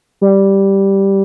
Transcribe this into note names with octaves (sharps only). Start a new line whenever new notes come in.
G3